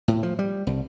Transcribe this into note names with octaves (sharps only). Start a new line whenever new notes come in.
A2
F3
G3
C2